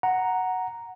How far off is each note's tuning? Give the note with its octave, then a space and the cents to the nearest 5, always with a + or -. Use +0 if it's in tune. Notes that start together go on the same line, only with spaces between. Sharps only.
F#5 +0 A#5 +0